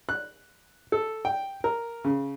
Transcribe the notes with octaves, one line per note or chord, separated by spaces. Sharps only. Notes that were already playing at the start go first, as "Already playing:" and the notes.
F#6
A4
G5
A#4
C#3